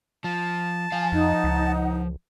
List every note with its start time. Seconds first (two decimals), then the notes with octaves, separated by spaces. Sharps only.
0.24 F3 A5
0.92 F3 F5 G#5
1.12 F2 D#4 F#5
1.44 C#2